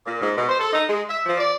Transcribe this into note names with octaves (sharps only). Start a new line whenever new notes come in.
A#2
G#2
B2
C5
A4
D#4
G#3
E5
F3
D5